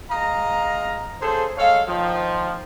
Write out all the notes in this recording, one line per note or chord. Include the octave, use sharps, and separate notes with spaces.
G#3 D#5 F5 A#5
C#3 G#4 A4 C5
G#3 A4 C#5 F5
D#3 F3